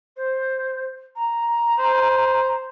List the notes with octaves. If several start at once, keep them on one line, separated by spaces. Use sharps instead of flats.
C5
A#5
C5